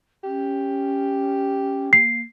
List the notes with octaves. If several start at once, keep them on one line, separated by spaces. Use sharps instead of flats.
C#4 G4
A#3 C7